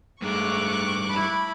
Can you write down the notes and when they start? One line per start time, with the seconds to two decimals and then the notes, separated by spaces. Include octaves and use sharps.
0.22 G2 G#3 A3 F5 C#6 D6 F#6
1.09 E4 A5 B5